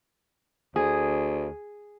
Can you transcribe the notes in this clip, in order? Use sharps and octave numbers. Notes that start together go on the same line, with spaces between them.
D2 G#4